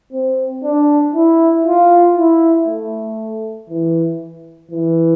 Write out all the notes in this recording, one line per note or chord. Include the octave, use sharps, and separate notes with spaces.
C4
D4
E4
F4
E4
A3
E3
E3